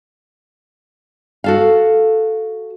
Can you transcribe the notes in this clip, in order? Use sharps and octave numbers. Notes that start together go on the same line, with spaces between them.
F#4 A4 F5